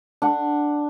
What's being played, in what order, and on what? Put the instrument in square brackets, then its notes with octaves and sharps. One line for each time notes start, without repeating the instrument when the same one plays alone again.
[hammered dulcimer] D4 F#5